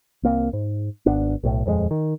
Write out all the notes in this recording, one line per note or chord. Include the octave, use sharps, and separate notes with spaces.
C2 A#3 C4
G#2
G#1 B3 D4
B1 A2
D#1 F2 E3 G#3
D#3